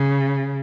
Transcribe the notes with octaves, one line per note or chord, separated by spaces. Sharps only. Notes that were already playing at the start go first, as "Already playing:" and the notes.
Already playing: C#3